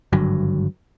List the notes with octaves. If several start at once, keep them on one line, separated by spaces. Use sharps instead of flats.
G#1 G2 D3 F#3